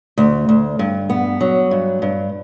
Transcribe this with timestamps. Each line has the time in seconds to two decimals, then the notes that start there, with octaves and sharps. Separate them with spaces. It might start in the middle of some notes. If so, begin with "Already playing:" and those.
0.18 D2
0.49 D2
0.79 G2
1.10 B3
1.41 F#3
1.71 G2
2.02 G2